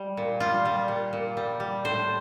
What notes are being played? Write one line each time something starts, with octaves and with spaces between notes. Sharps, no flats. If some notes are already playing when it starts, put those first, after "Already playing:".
Already playing: G3
A#2
G3 F4
G3
A#2
A#2
G3
G3
A2 C5